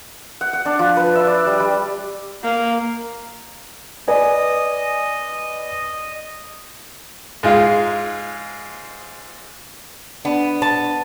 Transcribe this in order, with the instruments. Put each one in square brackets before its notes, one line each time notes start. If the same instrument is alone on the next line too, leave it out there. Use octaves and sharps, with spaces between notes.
[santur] F#5
F#5
D4
F3
B4
E5
D5
G3
G3
[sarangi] A#3
[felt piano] B4 D5 G#5 [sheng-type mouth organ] D#5
[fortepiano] G#2 G#3 F4
[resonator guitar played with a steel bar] B3 [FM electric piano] D4
[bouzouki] A5